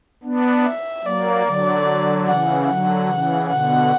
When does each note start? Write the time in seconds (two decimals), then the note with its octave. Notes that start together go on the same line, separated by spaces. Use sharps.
0.23 B3 D4
0.65 E5
1.05 F#3 A#3 D5
1.46 D3 F#3
2.27 C#3 E3 F#5
2.68 D3 F#3 F#5
3.09 C#3 E3
3.49 B2 D3 F#5